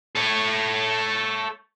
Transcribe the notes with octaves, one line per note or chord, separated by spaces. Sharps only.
A4 C#5